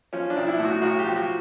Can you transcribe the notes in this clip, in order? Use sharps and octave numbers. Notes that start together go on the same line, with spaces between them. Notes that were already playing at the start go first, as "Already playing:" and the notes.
F3 C#4
D4
B1
E4
A2
F#4
B1 F#4
G4
F3
F#4